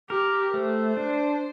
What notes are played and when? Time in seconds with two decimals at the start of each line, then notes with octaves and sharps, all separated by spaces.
0.10 G4 A#4
0.54 A3 C5
0.97 D4